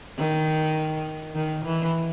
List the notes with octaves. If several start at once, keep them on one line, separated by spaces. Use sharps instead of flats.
D#3
D#3
E3